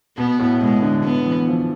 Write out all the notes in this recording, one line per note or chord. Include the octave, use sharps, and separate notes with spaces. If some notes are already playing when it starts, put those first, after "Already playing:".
B2 B3
A2
B2 G#3
D3
D3 B3
E3
F3